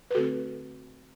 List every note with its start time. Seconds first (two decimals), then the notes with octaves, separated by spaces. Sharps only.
0.11 B4
0.15 D3 A3 C4 F#4 A4